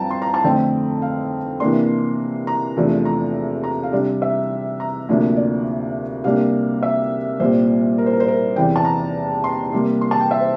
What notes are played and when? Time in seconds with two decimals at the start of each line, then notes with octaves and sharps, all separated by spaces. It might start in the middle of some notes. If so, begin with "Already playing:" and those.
Already playing: G2 F3 C4 G5 A5 A#5
0.11 C6
0.22 A#5
0.34 A5
0.44 F2 D3 A3 C4 G5
1.02 F5
1.60 C3 E3 A#3 D4 C6
2.47 A#5
2.77 E2 C3 F3 A3 D4
3.05 A#5
3.64 A#5
3.83 F5
3.92 C3 G3 D4
4.22 E5
4.80 A#5
5.09 D2 C3 F3 A#3 D4
5.37 D5
6.24 C3 G3 A#3 D4 F5
6.83 E5
7.40 C2 A#2 G3 C5
7.98 A#4
8.06 C5
8.13 A#4
8.20 C5
8.28 A#4
8.56 E2 C3 E3 G5
8.76 A5
8.85 A#5
9.44 C6
9.72 C3 G3 A#3
10.01 C6
10.11 A5
10.20 G5
10.31 E5
10.40 C5